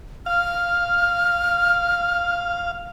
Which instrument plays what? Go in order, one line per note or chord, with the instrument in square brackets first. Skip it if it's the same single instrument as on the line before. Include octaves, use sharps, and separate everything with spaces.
[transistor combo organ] F5 [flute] F6